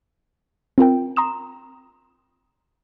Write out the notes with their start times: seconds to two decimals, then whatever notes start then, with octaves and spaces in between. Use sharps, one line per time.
0.78 C4 F4 A#4 G5
1.16 A#5 C6 D#6 E7